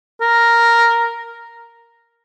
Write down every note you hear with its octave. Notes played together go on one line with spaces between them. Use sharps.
A#4